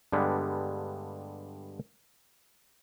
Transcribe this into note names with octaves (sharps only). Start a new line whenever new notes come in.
G2 D3 G3 G#3 B3